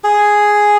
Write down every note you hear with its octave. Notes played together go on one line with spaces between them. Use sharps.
G#4